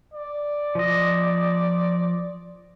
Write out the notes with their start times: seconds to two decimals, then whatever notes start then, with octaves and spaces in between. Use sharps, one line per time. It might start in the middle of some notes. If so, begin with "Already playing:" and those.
0.14 D5
0.75 F3 D#5